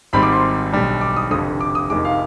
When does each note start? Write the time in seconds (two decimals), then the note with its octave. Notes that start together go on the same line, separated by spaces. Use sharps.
0.13 G#1 G#2 G3 C4 B5
0.23 D6
0.33 C6
0.72 B1 B2 G3 D4
1.01 D6
1.16 D#6
1.31 F1 F2 D3 D#6
1.61 D6
1.75 D#6
1.90 F1 F2 D#3 G#3 D6
2.05 F5